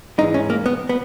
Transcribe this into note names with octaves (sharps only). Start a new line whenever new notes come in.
G#2 E3 G#3 D#4
C#4
A#3
B3
B3